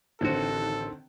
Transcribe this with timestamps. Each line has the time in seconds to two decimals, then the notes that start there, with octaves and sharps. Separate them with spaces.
0.21 A1 D3 D#3 C4 F#4 A4